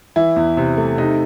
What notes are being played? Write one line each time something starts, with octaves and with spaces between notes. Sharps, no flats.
E3 E4
E2
C3
A3
C3 D#4